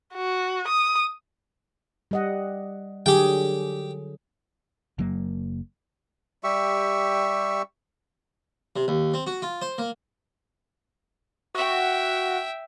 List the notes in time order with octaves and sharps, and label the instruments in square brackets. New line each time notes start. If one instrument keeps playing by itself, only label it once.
[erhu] F#4
D#6
[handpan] G3 D#5 F#5
[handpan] D3 F#3 G#4 [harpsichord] G4 G5
[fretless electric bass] F#1 F#3 A#3
[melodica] G3 G4 E5 C#6
[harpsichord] C3
D#2
C4
F#4
F4
C5
A#3
[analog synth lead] F#4 [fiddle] E5 G5